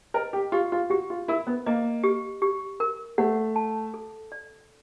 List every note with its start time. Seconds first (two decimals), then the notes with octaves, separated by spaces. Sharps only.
0.14 A#4 D#5
0.33 G4
0.52 F4 G4
0.72 F4
0.90 F#4 G4
1.10 F4
1.28 E4 A#4
1.47 B3
1.66 A#3 D#5
2.04 G4
2.42 G4
2.80 A#4
3.18 A3 F#5
3.56 A5
3.94 A4
4.32 D5